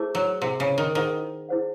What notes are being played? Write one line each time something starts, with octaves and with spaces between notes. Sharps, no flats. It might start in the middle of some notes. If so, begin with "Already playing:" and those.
Already playing: A3 E4 G#4 C5
F#3
C3 E4 G#4 C5 F#5
C#3
D#3
D#3 E4 G#4 C5 F#5
E4 G#4 C5 F#5